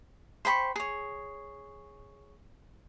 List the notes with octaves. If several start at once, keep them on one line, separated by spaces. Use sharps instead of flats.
C5 G5 B5 C#6
G#4 C#5